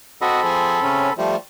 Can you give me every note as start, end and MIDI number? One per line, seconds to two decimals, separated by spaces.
0.21 1.13 60
0.21 0.41 66
0.21 1.13 69
0.21 0.41 75
0.21 1.13 83
0.44 0.80 53
0.44 0.80 68
0.83 1.10 49
0.83 1.10 61
1.18 1.36 53
1.18 1.36 55
1.18 1.36 57